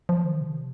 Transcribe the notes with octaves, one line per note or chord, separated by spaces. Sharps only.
F3
D#3
C3